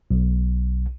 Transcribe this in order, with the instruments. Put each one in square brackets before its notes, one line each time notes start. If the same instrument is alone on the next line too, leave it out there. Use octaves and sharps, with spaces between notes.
[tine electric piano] B1